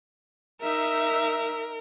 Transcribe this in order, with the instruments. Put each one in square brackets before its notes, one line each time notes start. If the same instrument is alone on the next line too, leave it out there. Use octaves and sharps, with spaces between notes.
[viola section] D#4 E5 [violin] A#4